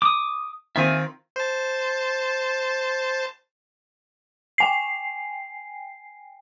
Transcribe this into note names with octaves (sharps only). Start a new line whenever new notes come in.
D6 D#6
D#3 C4 F4 E5 G#5
C5 A5
G5 G#5 C7